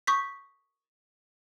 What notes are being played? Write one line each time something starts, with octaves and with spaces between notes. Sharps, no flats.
C#6 D#6 G6 B6